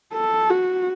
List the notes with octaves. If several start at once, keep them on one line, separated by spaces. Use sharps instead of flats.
A4
F#4